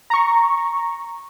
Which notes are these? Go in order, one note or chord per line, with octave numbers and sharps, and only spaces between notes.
A#5 C#6